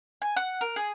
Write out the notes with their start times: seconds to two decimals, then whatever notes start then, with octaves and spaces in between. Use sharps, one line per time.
0.22 G#5
0.36 F#5
0.61 A#4
0.76 G#4